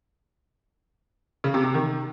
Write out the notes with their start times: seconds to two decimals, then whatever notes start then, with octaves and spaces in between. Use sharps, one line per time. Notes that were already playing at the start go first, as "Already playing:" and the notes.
1.44 C#3
1.54 C3
1.64 C3
1.74 D#3